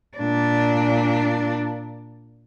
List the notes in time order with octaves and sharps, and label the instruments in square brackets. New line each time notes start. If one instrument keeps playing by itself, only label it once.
[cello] A#2 D4